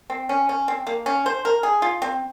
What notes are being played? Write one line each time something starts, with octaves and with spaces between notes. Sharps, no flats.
C4
C#4
C#4
C4
A#3
C#4
C5
A#4
G#4
F4
C4